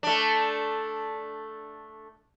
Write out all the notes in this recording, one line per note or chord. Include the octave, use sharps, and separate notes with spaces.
A3 D4